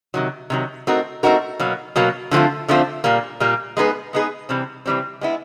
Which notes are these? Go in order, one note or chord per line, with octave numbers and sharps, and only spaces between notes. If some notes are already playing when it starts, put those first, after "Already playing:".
C3 D#3 F#3
C3 D#3 F#3
A3 C4 D#4 F#4 A#4
A3 C4 D#4 F#4 A#4
B2 F#3 A#3
B2 F#3 A#3
D3 F3 A3 C4 F4
D3 F3 A3 C4 F4
A#2 G3 A#3
A#2 G3 A#3
G#3 B3 D#4 G#4 B4
G#3 B3 D#4 G#4 B4
C3 E3 G3 C4
C3 E3 G3 C4
G#3 B3 E4